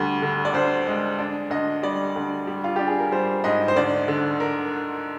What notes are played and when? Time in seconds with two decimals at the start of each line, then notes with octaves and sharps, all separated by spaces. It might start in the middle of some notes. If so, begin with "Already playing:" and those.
Already playing: D2 G3
0.22 D3
0.45 D5
0.53 D2 C5
0.87 G#3
1.19 D4
1.50 D2 D#5
1.83 G3 D5
2.16 D2
2.47 G3
2.64 F4
2.76 D4 G4
2.87 G#4
2.99 A#4
3.12 G3 C5
3.44 G#2 D#5
3.68 C5
3.76 D2 D5
4.08 D3
4.40 A#4